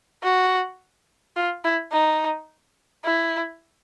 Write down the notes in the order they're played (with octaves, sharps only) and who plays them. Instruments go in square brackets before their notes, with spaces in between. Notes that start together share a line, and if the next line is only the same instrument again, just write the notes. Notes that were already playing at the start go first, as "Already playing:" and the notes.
[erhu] F#4
F4
E4
D#4
E4